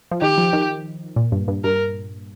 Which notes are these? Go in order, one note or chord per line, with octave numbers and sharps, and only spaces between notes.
F3
D#3 G4
F3
D#3
A#2
G2
G2
G2 A#4